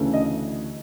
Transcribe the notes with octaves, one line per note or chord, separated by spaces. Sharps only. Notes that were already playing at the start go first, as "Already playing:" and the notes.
Already playing: D2 C#3 E3 A3
D#5